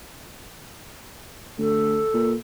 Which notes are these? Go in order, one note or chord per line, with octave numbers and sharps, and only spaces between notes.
D2 A4
A#2